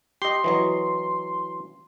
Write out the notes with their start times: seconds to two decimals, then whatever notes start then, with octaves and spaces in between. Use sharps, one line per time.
0.22 G4 D#5 C6
0.44 E3 F#3 D#5